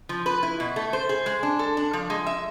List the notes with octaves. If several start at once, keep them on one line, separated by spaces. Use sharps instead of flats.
F3
B4
E4
B2
A3
C5
G#4
G#3
D4
A4
D4
F3
G#3
E5